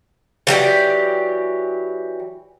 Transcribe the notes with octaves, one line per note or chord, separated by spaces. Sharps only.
E3 F#3 G4 D5